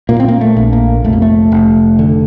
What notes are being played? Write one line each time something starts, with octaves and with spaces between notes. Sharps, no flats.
A#2 A#3
C4
A#3
A3
A#1
A#3
F1 A3
A#3
A3
F1
D3